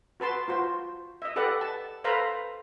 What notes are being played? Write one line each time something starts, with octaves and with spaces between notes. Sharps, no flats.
F#4 B4 A5 C6
F4 F#4 C5
D#5 E5
G4 A4 B4 D5 F#5
A5
A4 B4 C5 F5 A#5 B5